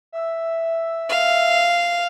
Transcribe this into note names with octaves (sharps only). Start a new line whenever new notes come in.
E5
F5